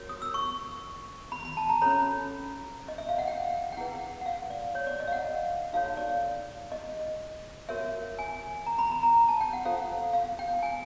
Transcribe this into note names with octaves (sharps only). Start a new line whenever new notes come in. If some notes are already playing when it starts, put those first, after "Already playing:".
Already playing: F#4 A#4 C#5
D#6
E6
C#6
B5
B5
A5
A#5
C#4 F#4 A4 C#5 B5
D#5
E5
F5
F#5
G5
G5
E4 G#4 B4 F#5
F#5
F5
D5
C#5
D5
D#5
F5
F#5
D#4 F#4 A4 C#5 F5
D5
D#5
F#4 A#4 C#5 E5
G#5
A#5
B5
A#5
A#5
A5
G5
F#5
F4 A4 C5 F5
F5
G5
G#5